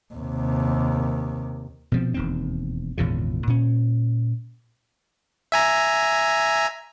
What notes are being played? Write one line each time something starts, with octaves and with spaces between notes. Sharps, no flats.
D#2 C3
B2 F3 C4
E1 D#2 C4
G#1 E2 A#2 C#3
A#2 C#4
E5 G#5 A#5